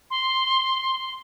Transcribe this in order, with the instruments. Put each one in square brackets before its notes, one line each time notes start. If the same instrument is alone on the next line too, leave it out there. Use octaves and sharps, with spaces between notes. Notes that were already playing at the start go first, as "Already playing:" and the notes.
[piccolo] C6